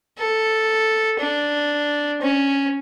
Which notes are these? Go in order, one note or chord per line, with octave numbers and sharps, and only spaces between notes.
A4
D4
C#4